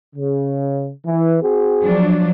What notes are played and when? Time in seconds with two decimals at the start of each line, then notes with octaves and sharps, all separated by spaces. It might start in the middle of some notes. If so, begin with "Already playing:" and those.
0.15 C#3
1.06 E3
1.42 C4 F#4 G#4
1.82 F3 F#3 D4